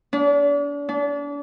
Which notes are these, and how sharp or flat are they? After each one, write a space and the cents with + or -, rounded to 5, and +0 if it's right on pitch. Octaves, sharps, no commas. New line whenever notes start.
D4 -40
D4 -35